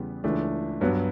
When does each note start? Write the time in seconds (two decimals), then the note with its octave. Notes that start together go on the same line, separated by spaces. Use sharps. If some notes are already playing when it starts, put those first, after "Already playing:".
Already playing: E2 C#3 G3 B3
0.24 C#2 C#3 E3 A3 D4
0.81 G2 F#3 B3